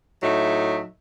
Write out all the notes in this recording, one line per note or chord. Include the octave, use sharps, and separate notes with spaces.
A2 F#3 D#4 E5